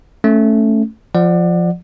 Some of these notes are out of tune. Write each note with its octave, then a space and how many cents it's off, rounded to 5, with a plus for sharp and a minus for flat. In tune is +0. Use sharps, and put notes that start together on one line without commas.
A3 +0 C#4 +0
F3 +0 D5 +25 F#5 +0